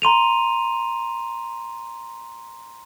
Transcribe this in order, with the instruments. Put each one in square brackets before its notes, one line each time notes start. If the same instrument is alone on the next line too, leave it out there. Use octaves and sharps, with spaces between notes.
[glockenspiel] A#5 C6 D#7 F7